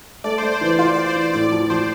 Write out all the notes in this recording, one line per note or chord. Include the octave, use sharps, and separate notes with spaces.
A3 D5
A3 C5
C5
E3 D5
F4 D5
F4 D5
C5
E3
C5
A2 D5
F3 D5
F3 C5